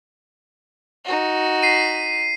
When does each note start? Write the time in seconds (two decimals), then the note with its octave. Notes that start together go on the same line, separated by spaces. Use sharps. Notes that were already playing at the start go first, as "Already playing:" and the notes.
1.05 D#4 F#4
1.62 B6 C7 D#7